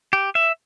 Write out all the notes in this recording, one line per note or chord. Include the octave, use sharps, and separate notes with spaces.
G4
E5